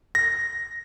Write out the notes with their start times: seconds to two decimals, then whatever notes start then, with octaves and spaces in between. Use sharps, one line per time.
0.15 A#6